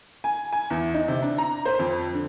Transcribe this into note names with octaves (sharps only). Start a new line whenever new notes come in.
G#5
G#5
E2
D#4
C3
D4
A#5
C5
F2
D3